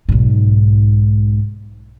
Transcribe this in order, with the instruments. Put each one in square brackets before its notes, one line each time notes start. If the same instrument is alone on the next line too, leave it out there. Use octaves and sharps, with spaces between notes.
[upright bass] B1 G#2